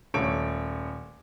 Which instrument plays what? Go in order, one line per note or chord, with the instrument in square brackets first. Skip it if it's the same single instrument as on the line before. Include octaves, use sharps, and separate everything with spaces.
[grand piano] D#1 A3 C#5 D7